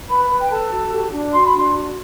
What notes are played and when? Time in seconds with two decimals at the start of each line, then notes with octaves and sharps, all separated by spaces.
0.09 B4 B5
0.30 B4
0.40 G5
0.50 A4 A5
0.70 F#4
0.91 G4
1.12 D4
1.32 F#4 C6
1.44 B5
1.53 D4 C6
1.73 F#4